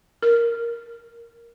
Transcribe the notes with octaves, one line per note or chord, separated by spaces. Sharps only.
A#4